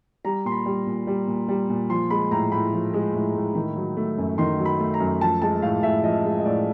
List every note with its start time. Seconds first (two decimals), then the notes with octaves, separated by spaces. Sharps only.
0.24 G3 A#5
0.45 A#2 C6
0.52 B5
0.66 G3
0.87 A#2
1.07 G3
1.27 A#2
1.49 G3
1.69 A#2
1.90 F3 C6
2.10 G#3 B5
2.31 A2 A#5
2.52 A2 B5
2.73 F3
2.94 G#3
3.14 A2
3.35 A2
3.55 D#3
3.76 F#3
3.97 A3
4.18 F#2
4.38 D#3 C6
4.59 F#3
4.65 B5
4.80 A3
4.94 A#5
5.00 F#2
5.21 F3 A5
5.42 G#3 A5
5.62 A2 F5
5.83 A2 E5
6.04 F3 D#5
6.25 G#3
6.40 D#5
6.45 A2 D5